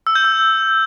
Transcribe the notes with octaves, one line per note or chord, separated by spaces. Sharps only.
E6
G6
E6